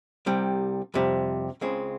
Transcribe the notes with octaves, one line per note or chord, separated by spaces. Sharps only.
C2 C3 G3
F2 C3 G3
C#2 C#3 G#3 C4